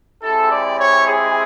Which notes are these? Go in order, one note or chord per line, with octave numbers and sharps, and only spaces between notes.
G#3 C4 E4 G4 A4
D5
C#5
G#4